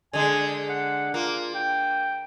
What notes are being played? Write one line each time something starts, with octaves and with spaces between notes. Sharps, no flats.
D3 G#3 G#5
F#5
A#3 F4
G5